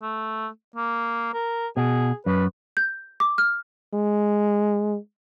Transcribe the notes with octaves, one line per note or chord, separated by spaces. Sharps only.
A3
A#3
A#4
B2 G#4
F#2 B4
G6
D6
F6
G#3